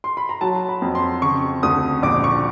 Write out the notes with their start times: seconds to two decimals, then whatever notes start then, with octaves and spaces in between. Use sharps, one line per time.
0.04 C6
0.17 B5
0.29 A#5
0.41 F#3 A5
0.69 B5
0.82 F2
0.95 C6
1.22 C#3 C#6
1.63 D2 D#6
2.03 A#1 D6
2.24 C#6